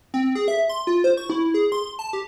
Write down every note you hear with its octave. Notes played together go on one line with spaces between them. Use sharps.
C4
G#4
E5
C6
F4
C5
C#6
E4
G#4
C6
A5
G4